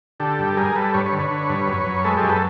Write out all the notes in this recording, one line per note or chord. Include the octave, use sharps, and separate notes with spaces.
D3 G4 A4
G2
A4
G3 G#4 A#4
G3 A4 B4
G2 B4 C#5
B4 C#5
D3
B4 C#5
D3
G2
F#2
F#2
G#3 A4 B4
G4 A4
F#2
A4 B4